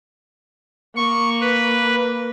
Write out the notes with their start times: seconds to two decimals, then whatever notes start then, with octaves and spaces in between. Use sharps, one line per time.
0.97 A#3 C#6
1.41 B4